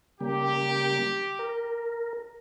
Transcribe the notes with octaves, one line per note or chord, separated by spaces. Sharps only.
C#3 G3 A#3 G4
A#4